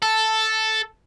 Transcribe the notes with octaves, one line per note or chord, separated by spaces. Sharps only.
A4